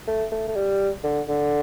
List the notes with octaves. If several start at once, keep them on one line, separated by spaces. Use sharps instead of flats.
A3
A3
A3
G3
D3
D3